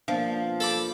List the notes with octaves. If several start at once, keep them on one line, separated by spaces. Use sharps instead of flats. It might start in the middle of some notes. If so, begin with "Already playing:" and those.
F3 A#3 B3 D4
A4 B5 D6